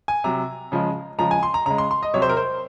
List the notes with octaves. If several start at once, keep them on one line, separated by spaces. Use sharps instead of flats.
G#5
C3 F#3 A#5
C#3 F3 G#3
C#3 F3 G#3 A#5
G#5
C6
A#5
C#3 G#3 A#5
C6
C6
D#5
C3 F#3 C#5
C5
A#4
C5